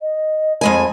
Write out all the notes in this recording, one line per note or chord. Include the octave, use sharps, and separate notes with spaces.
D#5
F2 G#3 G#5 B5